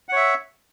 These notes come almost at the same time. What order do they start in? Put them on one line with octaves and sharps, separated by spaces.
F#5 C#5 E5